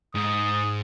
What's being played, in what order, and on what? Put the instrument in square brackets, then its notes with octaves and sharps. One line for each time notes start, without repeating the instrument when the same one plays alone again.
[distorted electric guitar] G#2 [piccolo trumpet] D#6